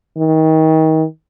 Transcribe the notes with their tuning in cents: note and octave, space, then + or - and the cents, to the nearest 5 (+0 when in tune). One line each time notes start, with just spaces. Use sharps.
D#3 +30